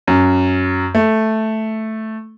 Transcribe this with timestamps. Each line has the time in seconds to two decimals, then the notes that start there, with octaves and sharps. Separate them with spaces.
0.07 F#2
0.95 A3